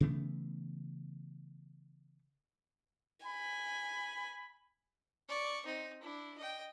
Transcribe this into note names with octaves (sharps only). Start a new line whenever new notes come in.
C#3 E3 A3 B3
G#5 B5
D5 C#6
C4 D#4
D4 E4
D#5 G5